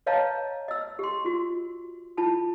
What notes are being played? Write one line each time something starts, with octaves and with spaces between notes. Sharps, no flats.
B4 C#5 D#5 F5 A5 A#5
D#5 E6
G4 C6
F4 F#4
E4 F4 A5 B5